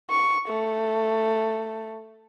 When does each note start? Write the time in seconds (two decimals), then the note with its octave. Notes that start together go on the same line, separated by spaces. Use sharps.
0.10 C#6
0.48 A3